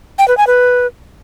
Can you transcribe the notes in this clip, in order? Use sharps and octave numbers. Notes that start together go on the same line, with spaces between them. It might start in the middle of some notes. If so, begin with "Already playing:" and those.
G5
B4
G#5
B4